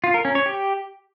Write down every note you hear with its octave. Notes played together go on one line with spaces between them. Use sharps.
F4
A#4
C#4
C#5
G4